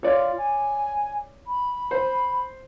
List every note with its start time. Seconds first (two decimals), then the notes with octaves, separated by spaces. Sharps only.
0.03 F4 C#5 D5
0.38 G#5
1.47 B5
1.91 C5